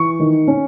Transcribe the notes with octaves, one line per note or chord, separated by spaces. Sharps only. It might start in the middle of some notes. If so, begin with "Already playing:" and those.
Already playing: E3 C#6
D#3
C#4